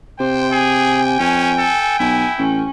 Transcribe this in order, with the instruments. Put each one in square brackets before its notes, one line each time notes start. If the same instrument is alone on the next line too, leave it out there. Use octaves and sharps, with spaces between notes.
[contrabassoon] C3 [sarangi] C5 [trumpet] G5
[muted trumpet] G#4 [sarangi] G#5
[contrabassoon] F2 [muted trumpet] C#4
[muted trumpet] A4
[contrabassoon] B1 [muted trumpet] E4
[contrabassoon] A1 [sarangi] C#4